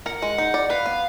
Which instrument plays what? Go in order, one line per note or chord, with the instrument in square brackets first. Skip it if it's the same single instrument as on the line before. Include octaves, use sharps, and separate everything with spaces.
[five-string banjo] A#4 [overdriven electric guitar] F#5
[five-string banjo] G#3
D#4
D5
[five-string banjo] B4 [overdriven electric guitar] F5
[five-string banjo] B3